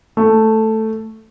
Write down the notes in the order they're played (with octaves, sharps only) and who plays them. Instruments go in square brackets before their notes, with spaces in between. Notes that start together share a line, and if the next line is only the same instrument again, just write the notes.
[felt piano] A3